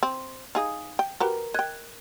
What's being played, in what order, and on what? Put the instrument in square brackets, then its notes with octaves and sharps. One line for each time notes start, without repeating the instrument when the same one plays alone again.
[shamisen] C4
[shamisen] D#4 G#4 [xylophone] F5 D#6
[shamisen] G5
[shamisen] F#4 G4 B4 [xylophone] A#4 A#5
[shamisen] D#5 G5 [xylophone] F#6 G#6